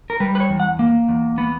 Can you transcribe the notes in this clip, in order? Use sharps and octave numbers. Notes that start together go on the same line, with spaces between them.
A#4
G3 B4
B4
C#5
E2
F#5
A#3
E2
B3